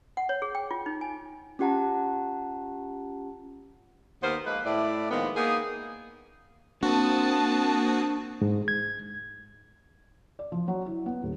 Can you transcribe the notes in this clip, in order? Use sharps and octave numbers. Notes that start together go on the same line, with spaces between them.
F#5
C#5
G#4
G5
F4
D#4
G#5
C#4 F4 G4 F#5 A5 A#5
D#2 B3 A#4 C5
F3 G#3 A#3 B4
A2 E4 D5
D#3 F3 G#3 A#3 B3
A#3 B3 D#4 G#4
A#3 C4 D4 F#4 A5 D#6
G#2
G#6
D5
F3
F#3
E4
B3
D#1